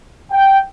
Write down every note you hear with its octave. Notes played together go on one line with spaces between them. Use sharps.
G5